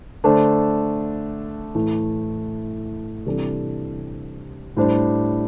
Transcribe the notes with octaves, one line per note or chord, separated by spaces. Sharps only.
D3 A3 D4 A4 C5
A2 E3 A3
C3 E3 G3 D4 A4
A2 G3 D4 C5